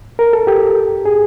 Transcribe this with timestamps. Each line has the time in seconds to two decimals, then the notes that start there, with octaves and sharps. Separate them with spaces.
0.19 A#4
0.33 A4
0.47 G4
1.05 G#4